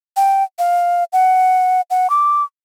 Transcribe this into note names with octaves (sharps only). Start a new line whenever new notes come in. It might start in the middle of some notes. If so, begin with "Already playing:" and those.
G5
F5
F#5
F#5
D6